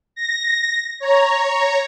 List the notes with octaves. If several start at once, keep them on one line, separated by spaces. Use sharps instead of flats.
A#6
C#5 A#5